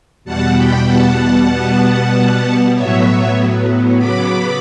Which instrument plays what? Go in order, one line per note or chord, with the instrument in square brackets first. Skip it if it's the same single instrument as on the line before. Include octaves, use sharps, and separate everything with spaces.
[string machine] E2 B2 G3 F#5 A5
G5 B5
F#5 A5
B2 G3 B3
A2 F#3 B3 C#5 E5
C#3 F#3 B3 B5 D6